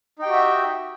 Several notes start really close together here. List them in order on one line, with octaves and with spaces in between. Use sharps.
D#4 G5 G4 F#4 E5